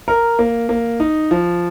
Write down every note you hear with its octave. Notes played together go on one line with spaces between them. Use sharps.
A#4
A#3
A#3
D#4
F3